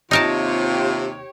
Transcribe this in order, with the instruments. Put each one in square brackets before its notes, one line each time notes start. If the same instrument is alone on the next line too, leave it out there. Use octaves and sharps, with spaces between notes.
[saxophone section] D#2 C3 [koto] D#4 A#4 A5 [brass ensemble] F4 [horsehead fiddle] G4 C#5